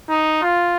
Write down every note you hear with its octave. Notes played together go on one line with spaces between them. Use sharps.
D#4
F4